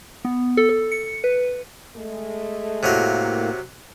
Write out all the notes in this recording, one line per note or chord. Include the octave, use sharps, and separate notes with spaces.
B3
A4
A4
C#7
B4
G#3 A3
A2 C3 F#3 A#3 A#4